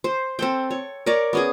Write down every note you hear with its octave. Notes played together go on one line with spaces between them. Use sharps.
C5
C4 A4 G5
C#5
A#4 C#5 D5
B3 C#4 G#4